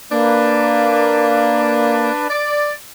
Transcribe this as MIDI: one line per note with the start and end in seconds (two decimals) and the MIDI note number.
0.12 2.11 58
0.12 2.28 62
0.12 2.28 71
2.29 2.73 74